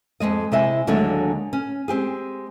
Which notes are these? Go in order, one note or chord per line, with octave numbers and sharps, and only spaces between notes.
F2 B2 G#3 D#5
C3 G#3 E4 D#5 E5 G#5
D#2 D3 F#3 G#3 A3 D4
C#4
G#3 C4 G4 G#4